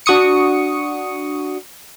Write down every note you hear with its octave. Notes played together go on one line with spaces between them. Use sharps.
D4 F#4 C#6 D#6 C#7